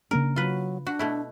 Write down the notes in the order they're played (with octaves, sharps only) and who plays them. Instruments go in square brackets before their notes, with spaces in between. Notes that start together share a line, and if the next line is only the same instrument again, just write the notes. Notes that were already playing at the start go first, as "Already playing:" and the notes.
[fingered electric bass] C#3 A#3 D4 [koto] A#4
[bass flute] F#3 [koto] F4 B4
[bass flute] D4 [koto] F#4
[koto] B2 A3 E4